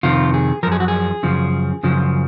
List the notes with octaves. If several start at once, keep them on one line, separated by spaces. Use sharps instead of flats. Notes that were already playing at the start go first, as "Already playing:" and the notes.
F2 C3 D#3 F4
G#4
F#2 F3 G#4 A#4
F#4
G#4
F#2 C#3 F3
F#2 C#3 F3